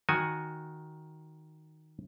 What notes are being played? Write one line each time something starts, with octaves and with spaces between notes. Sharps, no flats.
D#3 F#4 G#5